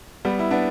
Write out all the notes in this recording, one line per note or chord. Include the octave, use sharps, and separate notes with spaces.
G3 B3
E4
B3 D4